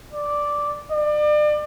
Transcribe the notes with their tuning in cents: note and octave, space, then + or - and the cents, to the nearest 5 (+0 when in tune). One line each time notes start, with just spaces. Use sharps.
D5 -5
D5 +35